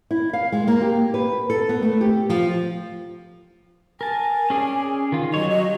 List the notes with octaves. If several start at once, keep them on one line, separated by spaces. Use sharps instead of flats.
E4
F5
G#3
A#3
G4
B4
A4
B3
A3
G4
F3
A#4 G#5 A5
C#4 G#4 D5
D#3 F4
F#3 G3 C#5 D#5
D#5